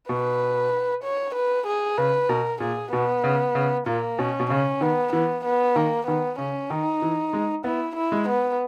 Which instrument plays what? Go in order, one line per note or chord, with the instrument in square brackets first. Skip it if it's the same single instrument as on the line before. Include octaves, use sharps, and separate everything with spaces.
[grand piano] B2 [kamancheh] B4
[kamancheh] C#5
B4
G#4
[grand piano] C#3 [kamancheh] B4
[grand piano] B2 [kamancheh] A#4
[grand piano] A#2 [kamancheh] G#4
[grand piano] B2 [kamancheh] B3
[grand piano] C#3
C#3
[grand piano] A#2 [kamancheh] A#3
[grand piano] B2 [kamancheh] C#4
[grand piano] B2
[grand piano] C#3 [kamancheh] C#4
[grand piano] D#3 [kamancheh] B3
[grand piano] E3 [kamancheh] B3
[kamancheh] B3
[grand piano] D#3 [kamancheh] A#3
[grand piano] D#3 [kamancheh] B3
[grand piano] C#3 [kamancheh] C#4
[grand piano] D#3 [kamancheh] D#4
[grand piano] E3
G#3
[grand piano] B3 [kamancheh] E4
[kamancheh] E4
[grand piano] G#3
[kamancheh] B3